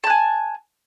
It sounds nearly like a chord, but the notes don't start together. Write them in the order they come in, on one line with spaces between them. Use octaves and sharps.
A5 F#6 G#5